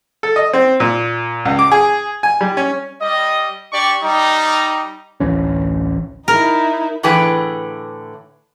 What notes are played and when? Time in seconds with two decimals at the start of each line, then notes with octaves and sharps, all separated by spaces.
0.23 A4
0.36 D#5
0.54 C4
0.80 A#2
1.45 C#2
1.59 D6
1.72 G#4
2.23 G#5
2.41 G3
2.57 C#4
3.01 G3 D#5
3.72 D4 G4 D5 C#6
4.03 G3 D#4
5.20 A1 D2 E3 C#4
6.28 D#4 E4 A#4
7.03 A2 D3 E3 G#4 B4 G5